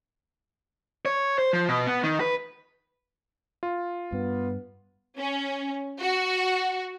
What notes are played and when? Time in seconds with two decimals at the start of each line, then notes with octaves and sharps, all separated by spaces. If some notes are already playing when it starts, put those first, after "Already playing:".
1.06 C#5
1.39 C5
1.53 F3
1.69 B2
1.87 B3
2.03 D#3
2.20 B4
3.63 F4
4.12 G2 B3
5.18 C#4
5.99 F#4